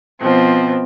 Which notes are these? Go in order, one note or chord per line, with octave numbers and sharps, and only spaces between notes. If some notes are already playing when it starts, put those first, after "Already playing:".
B2 F3 C4